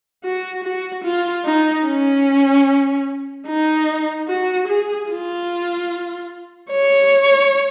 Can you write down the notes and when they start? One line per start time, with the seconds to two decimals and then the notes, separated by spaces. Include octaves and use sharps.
0.24 F#4
0.64 F#4
1.04 F4
1.45 D#4
1.86 C#4
3.47 D#4
4.28 F#4
4.68 G#4
5.09 F4
6.70 C#5